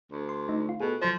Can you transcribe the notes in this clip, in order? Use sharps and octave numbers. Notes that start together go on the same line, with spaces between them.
D2
C6
A3 D#4
F4
B2 G#4 A4
F3 F#3 C5